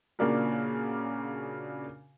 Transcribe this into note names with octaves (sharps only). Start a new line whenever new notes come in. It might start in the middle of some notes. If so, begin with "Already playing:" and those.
A#2 C#3 A#3 D4 F#4 A#4